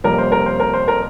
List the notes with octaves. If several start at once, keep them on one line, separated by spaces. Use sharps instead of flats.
F2 C3 G3 A#3 C#4 A#4
C5
A#4
C5
A#4
C5
A#4